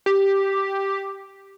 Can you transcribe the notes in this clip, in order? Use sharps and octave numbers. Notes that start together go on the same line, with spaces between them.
G4